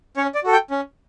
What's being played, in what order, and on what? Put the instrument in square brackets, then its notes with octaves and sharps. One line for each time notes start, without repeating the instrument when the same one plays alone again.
[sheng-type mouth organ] C#4 C#5
D5
F#4 A4
G5
C#4